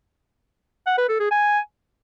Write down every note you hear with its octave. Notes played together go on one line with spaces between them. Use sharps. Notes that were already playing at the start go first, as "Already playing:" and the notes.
F#5
B4
A4
G#4
G#5